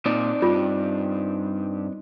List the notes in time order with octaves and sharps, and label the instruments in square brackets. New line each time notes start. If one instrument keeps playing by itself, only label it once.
[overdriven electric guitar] A#2 [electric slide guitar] C4 D#4 D5
[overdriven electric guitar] G2 [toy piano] F4